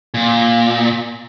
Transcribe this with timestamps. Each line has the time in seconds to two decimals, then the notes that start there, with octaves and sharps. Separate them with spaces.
0.14 A#2